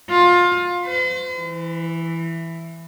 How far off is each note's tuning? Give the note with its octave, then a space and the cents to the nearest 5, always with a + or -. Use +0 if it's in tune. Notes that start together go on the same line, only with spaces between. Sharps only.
F4 +20
C5 -45
E3 +5